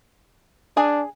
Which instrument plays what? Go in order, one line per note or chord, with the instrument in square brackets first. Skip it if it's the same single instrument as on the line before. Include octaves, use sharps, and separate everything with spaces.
[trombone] D4 [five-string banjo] G#4 G#5